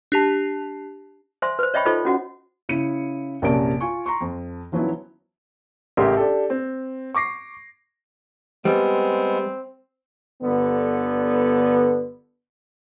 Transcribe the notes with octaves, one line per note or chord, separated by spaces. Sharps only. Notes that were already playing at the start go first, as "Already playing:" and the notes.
D4 G4 A5
C5 E5 G#5 C6
B4 C5
C#5 D#5 E5 G5 B5 C#6
D#4 F4 A4 C5 D#5 C#6
C#4 F#4 F#5
C#3 E4 C#7 D#7
A#1 F#2 C3 A#4 A5 D7
F4 G#5 C#6
A#5 C6 C#6
F2
D#3 F3 F#3 B3 C#4 E4
A1 C#3 G4 A#4 E5 C6
D4 G4 A4
C4
C#6 D6 A#6 C7
G3 G#3 B3 C4
G1 D3 B3